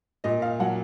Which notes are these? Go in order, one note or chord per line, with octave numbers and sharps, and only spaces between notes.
A#2 D#5
F5
F#3 F#5